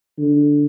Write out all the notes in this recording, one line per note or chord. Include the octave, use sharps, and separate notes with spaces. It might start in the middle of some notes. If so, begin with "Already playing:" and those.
D3